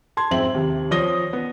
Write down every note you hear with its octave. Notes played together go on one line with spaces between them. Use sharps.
A5 C6 G#6
F2 G#2 C4 E5 F#7
D#2 C3
F3 C#5 D5 D#6 A#6 G7
B3